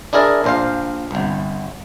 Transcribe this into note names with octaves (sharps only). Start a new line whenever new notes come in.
D4 E4 G#4 A#4 D5
A#1 C5 F5
G1 C2